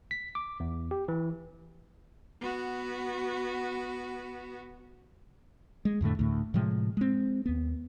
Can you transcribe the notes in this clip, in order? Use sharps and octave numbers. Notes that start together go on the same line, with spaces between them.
B6
D6
E2
G4
E3
B3 F#4
G#3
F2 A2 D3 A3
D2 A2
A2 C3 F3 G#3
G#3 C4
D#2 B3